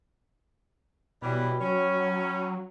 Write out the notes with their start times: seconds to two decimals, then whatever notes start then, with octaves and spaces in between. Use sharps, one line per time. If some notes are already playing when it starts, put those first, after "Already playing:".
1.22 B2 E3 F#3 G3 F#4 G5 B5
1.60 F#3 C#4